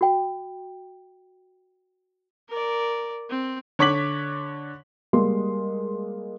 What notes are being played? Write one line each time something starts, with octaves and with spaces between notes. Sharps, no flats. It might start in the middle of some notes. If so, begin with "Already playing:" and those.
F#4 G5
A#4 D5
C4
D3 C#5 C#6 D6 B6 F#7
G3 G#3 A#3 C6